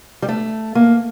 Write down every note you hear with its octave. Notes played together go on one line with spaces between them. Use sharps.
G3
A3
A#3